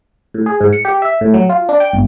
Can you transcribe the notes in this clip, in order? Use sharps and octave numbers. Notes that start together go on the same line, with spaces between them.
A2
G#4
G#2
C#7
G4
E5
A2
F#3
F4
D4
G5
G1